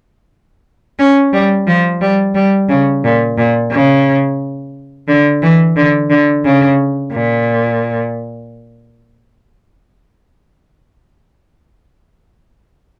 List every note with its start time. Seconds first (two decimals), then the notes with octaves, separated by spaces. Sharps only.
0.99 C#4
1.33 G3
1.67 F3
2.01 G3
2.35 G3
2.69 C#3
3.04 A#2
3.38 A#2
3.71 C#3
5.08 D3
5.42 E3
5.76 D3
6.10 D3
6.45 C#3
7.13 A#2